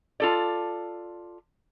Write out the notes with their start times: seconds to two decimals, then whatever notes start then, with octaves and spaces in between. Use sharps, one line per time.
0.20 F4 A4 D5